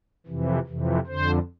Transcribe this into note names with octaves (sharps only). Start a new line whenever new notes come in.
F2 C3 E3
F2 C3 E3
F2 D3 C5